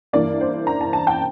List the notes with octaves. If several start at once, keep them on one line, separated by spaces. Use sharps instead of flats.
G2 E3 A#3 D5
C5
A#5
A5
A5
G5